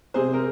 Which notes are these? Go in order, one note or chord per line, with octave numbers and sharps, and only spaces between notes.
C3 G#4 C5
A#4